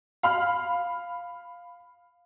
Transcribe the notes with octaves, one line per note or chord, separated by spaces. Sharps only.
F5 B5 F6